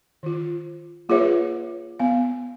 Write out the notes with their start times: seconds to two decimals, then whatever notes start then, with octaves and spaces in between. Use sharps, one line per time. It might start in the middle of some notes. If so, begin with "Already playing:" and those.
0.23 D#3 F4
1.09 A#3 F4 G#4 B4 C#5 E5
1.99 B3 F5